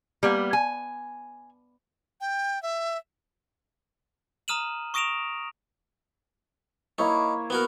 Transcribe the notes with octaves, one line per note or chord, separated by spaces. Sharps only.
G3 A#3 B3
G#5
G5
E5
A#5 D#6 F6 D#7 E7 F#7
C#6 D#6 A#6 D7 E7 F7
A#3 D#4 E4 C#5
B3 F#4 A#4